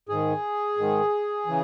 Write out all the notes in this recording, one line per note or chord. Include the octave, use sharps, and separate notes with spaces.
G#2 D#3 G#4
G#2 D#3
C#3 E3